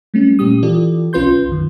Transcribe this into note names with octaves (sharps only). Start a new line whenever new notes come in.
G3 A3 C#4
A#2 C#4 G4 D#6
E3 F4 G4 A4 D5
B1 C#4 F4 B4 C6 G6
F#2 D#3